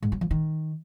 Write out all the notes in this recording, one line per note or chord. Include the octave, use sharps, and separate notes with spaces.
G#2
F#3
F3
D#3